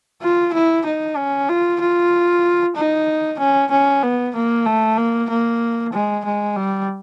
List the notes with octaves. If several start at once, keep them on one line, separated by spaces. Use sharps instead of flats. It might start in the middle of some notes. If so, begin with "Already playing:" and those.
F4
E4
D#4
C#4
F4
F4
D#4
C#4
C#4
B3
A#3
A3
A#3
A#3
G#3
G#3
G3